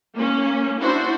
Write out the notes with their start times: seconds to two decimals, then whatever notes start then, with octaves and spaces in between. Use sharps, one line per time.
0.14 A#3 C#4
0.80 D4 E4 F#4 C5